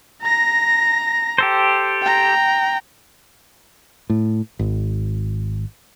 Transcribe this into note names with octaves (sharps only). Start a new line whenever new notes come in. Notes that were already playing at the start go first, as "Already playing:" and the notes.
A#5 A#6
G4 A4 C5
G5 A#5
A2
G#1